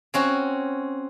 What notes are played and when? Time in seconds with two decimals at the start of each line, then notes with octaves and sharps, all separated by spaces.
0.14 C4 C#4 F#4